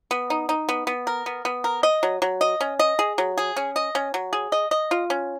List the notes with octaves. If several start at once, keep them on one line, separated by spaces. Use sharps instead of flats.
B3
D#4
D#4
B3
B3
A#4
B3
B3
A#4
D#5
F#3
F#3
D#5
C#4
D#5
G#4
F#3
G#4
C#4
D#5
C#4
F#3
G#4
D#5
D#5
F4
C#4